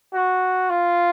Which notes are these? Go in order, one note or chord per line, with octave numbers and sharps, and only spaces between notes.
F#4
F4